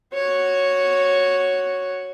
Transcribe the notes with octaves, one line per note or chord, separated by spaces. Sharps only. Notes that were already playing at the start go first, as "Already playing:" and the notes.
F#4 C#5